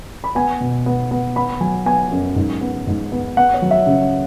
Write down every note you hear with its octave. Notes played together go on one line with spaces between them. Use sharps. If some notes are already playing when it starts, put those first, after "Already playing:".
B5
B3 G#5
B2
B3
B3
B3 B5
F#3 G#5
B3 G#5
F#2
G#2
B3
G#2
B3
B3 F#5
C#5
F#3
E5
C#3